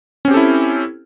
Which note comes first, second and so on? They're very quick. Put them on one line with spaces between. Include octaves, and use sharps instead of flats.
C#4 C4 G4 A4 E4